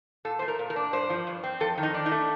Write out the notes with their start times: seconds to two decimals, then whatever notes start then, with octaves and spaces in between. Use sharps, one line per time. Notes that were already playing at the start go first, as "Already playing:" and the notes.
0.25 A#2 A4
0.39 A3 C5
0.48 A#4
0.59 A#2
0.70 A#4
0.76 D4
0.93 G2 C5
1.10 F3
1.27 G2
1.43 C4
1.60 F2 A4
1.78 D#3
1.83 D#4
1.94 D4
2.06 D#4
2.12 A3